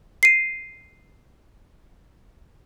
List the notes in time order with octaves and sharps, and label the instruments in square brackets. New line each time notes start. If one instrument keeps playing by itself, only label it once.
[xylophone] C7 D#7